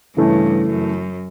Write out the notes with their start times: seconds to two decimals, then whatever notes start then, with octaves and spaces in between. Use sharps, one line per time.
0.17 G2 C#3 E3 A3 C#4
0.68 F#2